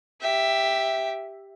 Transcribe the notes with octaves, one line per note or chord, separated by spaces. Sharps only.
G4 E5